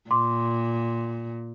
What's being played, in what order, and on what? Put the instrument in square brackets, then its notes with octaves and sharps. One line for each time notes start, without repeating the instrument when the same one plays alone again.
[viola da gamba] A#2 [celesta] C6 D6